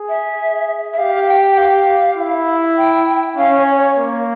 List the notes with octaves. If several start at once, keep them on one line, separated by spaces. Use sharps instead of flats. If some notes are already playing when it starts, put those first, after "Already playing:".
Already playing: G#4
E5
E5
G4 F5
G5
G5
F5
E4
G5
C#4 F5
C#5
C#5
A#3